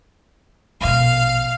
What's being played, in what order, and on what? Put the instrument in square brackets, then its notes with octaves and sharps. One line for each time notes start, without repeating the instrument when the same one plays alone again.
[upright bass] A#1 B2 [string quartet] F5